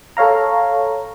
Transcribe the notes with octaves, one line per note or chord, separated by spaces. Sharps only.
A4 C#5 F5 A#5